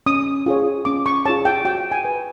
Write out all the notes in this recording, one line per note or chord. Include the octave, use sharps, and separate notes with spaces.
C#4 D#6
F4 G#4 C#5
C#4 D6
C#6
F4 G#4 C#5 A5
G5
F#4 G5
G#5
B4